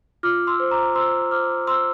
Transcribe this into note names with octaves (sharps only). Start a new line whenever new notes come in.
F4 D6 F6
C6 E6
C5
A#5 D6
C5 C6 E6
C5 D6 F6
C5 C6 E6